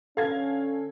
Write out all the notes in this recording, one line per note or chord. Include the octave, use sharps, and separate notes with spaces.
D3 C#4 A4 F5 G#6